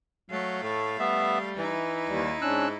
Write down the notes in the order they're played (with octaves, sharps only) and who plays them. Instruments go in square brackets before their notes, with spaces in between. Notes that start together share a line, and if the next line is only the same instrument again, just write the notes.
[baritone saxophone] F#3 [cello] A3 F5
[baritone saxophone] A2
[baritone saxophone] G3 [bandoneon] B3 E5
[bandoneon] E3 [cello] D#4 E4
[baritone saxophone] D#2 [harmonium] G3
[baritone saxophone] G#2 [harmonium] C#4 D4 [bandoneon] E6 F#6